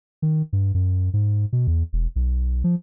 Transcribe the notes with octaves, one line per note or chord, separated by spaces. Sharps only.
D#3
G2
F#2
G#2
B2
E2
E1
B1
F3